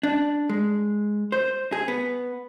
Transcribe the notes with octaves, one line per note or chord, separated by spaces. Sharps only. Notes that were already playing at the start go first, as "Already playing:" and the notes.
D4
G#3
C5
G#4
B3